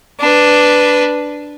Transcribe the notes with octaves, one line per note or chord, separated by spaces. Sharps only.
D4 B4